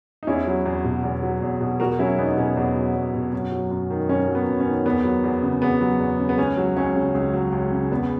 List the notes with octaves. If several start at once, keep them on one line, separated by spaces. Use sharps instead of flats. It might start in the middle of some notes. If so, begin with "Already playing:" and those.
D#4
E2 C#4 E4
F#3
E2
B2
E2
F#3
E2
B2
E2 F#4 A#4
F#3 C#4 E4
E2 B3 D#4
B2 C#4
E2
F#3
E2
B2
F#2
F#3
F#2
D#3
F#2 C#4
F#3
B3
F#2
C#4
D#3
E2 B3
F#3
E2
C#3
E2 B3
F#3
E2
C#3
B3
C#2 C#4
F#3
C#2 C#4
C#3
C#2
F#3
C#2
C#3
E2 B3